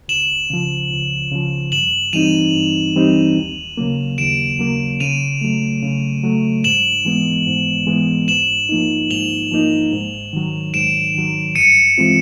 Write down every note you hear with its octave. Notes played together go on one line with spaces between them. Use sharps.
C#2 E7 F#7
C#3 F3
C#2
C#3 F3
G2 E7 F#7
E3 G3 C4 D#4 D#7 F7
G2
E3 G3 C4 D#4
D#2
C#3 F#3 A#3
D#2 D7 E7
C#3 F#3 A#3
C#3 D#7 F7
F#3 A3
C#3
F#3 A3
G#2 E7 F#7
E3 G#3 B3
G#2
E3 G#3 B3
G#2 E7 F#7
F3 A#3 D#4
G#2 F7 G7
F3 A#3 D#4
G#2
D#3 F#3
G#2 D7 E7
D#3 F#3
G2 C#7 D#7
E3 G#3 C4 F4